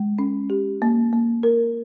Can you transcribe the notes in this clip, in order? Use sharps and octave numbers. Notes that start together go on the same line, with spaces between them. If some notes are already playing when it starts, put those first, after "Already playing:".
Already playing: G#3
C#4
G4
A#3
A#3
A#4